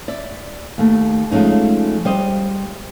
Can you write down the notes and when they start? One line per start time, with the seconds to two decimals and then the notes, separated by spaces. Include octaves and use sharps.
0.08 D5 E5
0.78 D#2 A3
1.31 F3 G#3 A3 C#4 D#4
2.05 G3 C5 D#5 F5